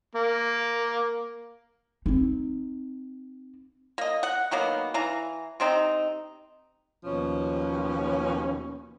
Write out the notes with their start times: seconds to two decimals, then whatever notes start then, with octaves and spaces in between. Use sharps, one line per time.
0.15 A#3
2.06 C4 D#4
3.98 A#3 D#5
4.23 F#5
4.51 D#3 F#3 A#3 B3
4.94 E3 F5 A#5
5.60 C3 C4 D#4
7.04 D#2 B2 F3 C#4